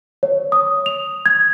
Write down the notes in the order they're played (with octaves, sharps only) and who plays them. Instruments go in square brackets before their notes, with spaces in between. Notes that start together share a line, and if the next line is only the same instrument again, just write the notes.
[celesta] C#5
D#6
F7
G#6